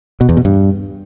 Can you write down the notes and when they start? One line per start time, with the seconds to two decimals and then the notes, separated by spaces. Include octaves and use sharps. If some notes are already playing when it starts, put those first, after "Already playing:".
0.21 B2
0.29 E2
0.37 B2
0.45 G2